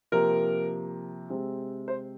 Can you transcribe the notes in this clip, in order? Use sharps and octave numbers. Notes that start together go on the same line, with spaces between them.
C3 F3 A#3 A#4
C3 G#3 C4
C5